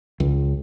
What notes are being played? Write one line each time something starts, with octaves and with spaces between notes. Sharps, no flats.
C#2